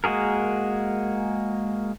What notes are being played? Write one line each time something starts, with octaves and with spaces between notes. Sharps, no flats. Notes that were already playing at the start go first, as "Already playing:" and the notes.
G#3 A#3 F#4 G#4 A#4